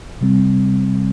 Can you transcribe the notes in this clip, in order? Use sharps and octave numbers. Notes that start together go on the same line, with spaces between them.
C3 G3 C4